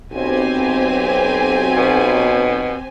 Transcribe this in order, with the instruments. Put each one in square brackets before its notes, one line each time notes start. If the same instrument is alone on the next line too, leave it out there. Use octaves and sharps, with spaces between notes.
[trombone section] B1 [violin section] C4 G4 G#5
[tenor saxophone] B2